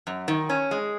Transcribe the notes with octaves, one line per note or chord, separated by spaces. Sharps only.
F#2
D#3
C#4
G#3